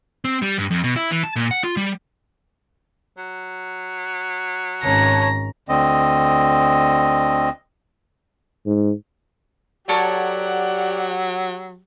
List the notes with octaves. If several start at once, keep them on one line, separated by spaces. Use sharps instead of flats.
C4
G3
G2
F2
B2
E4
E3
A5
A#2
F#5
F4
G3
F#3
G#1 C#4 C#5 A5 A#5
D2 D3 C4 D#5
G#2
F#3 G4 A4 A#4 C#5 D5 F#5